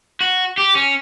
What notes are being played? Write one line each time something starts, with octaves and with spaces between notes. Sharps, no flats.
F#4
G4
C#4